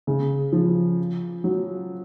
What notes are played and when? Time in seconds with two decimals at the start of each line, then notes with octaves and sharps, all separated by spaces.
0.07 C#3
0.52 F3
1.44 F#3